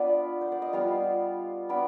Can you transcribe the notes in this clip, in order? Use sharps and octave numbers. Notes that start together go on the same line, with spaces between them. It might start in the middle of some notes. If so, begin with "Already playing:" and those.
Already playing: B3 D4 F4 B4 D5
C5
D5
D#5
G3 B3 F4 D5 F5
B3 D4 F4 B5 D6